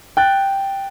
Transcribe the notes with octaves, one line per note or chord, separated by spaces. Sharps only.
G5 F#6 A6